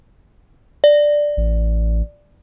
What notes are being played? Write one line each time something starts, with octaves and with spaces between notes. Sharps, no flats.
D5
A1